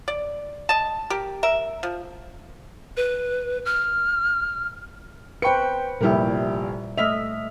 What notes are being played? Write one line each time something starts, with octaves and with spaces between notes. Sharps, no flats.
D5
D#5 A5
G4 A#4
A#4 E5
F3
B4
F6
B4 C5 G5 C#6 C#7
F1 A#2 G3 E4 G4 A#4
A3 D#5 E5 F6 B6 F7